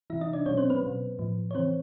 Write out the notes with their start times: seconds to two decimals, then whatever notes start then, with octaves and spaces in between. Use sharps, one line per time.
0.10 C3 E3 E4 E5
0.21 D#4 D#5
0.33 D4 D5
0.46 B2 C#4 C#5
0.50 F#3
0.57 C4 C5
0.70 B3 B4
0.82 B2 F#3
1.19 A2 F3
1.51 C#5
1.54 C#3 E3 C4 C5